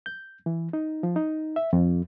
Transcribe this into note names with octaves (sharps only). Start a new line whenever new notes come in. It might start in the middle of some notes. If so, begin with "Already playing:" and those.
G6
E3
D#4
F3
D#4
E5
F2